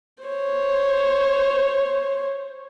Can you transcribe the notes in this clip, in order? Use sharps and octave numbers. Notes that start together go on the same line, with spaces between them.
C5 C#5